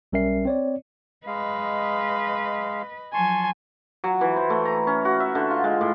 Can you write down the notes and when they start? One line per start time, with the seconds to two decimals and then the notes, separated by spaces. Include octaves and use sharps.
0.13 B1 G3 C#4 A#4 E5 C7
0.45 C4 C#5 D5
1.27 G#3 B4 D#5 F5
3.14 F3 F#3 G#5 A5 C6 C#6
4.04 F#3
4.21 E3
4.36 C5
4.50 A3
4.65 A#5
4.87 C#4
5.05 F#4
5.20 E5
5.35 D3
5.51 F4
5.64 G#3
5.81 A2